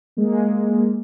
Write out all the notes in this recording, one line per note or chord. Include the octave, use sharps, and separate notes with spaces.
G#3 A#3